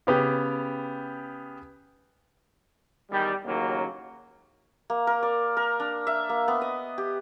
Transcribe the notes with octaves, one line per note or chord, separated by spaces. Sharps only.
C#3 B3 G4
E2 D#3 G3
A1 D#2 C#3 F#3 A#3
A#3
A#4
D5
A#4
D4
E5
A#3
B3
D#5
G4